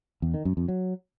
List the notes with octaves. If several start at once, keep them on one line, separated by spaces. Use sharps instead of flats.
E2
D#3
F#2
F2
F#3